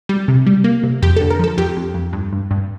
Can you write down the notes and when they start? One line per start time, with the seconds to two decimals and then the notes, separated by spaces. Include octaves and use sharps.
0.09 G3
0.28 C3
0.47 G3
0.64 A#3
0.83 C3
1.02 F2 G4
1.16 D3 A4
1.30 A#4
1.39 F3 A4
1.58 F2 G4
1.77 F2
1.94 F2
2.13 G2
2.33 G2
2.51 G2